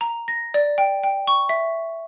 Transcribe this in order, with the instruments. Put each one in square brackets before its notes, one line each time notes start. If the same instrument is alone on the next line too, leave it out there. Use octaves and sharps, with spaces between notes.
[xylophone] A#5
A#6
D5
G5
G5
C#6
E5